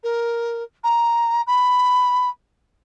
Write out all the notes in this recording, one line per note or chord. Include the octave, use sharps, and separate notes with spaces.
A#4
A#5
B5